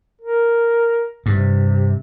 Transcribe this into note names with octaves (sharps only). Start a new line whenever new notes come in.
A#4
G2 C3